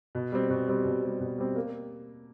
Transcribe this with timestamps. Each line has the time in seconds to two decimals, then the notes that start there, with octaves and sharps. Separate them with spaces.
0.15 B2
0.32 G3 C4
0.50 B2
0.68 G3 C4
0.85 B2
1.03 G3 C4
1.20 B2
1.38 G3 C4
1.56 A#3